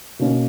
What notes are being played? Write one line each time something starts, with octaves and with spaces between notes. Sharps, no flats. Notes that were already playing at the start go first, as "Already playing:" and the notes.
B2 A#3 C#4